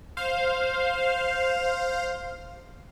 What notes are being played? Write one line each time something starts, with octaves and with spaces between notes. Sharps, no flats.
C5 F5